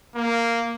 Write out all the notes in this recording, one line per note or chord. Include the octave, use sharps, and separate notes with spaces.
A#3